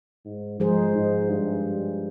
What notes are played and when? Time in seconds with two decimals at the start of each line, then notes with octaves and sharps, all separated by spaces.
0.26 G#2
0.60 G#2 F3 G#3 D#4 G#4 C5
0.95 G#2
1.29 G2